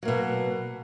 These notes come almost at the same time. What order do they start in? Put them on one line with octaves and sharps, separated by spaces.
F#3 A#3 B2